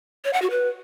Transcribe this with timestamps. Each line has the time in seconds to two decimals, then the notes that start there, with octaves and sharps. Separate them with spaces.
0.25 C#5
0.33 F#5
0.42 F#4
0.51 B4